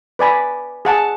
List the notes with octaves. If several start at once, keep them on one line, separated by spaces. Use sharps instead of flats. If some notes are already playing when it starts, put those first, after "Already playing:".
B4 D5 G#5 B5
G#4 F#5 A5